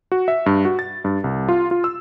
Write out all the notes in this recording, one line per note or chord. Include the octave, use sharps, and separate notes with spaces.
F#4
E5
G2
F#4
A6
G2
C2
F4
F4
E6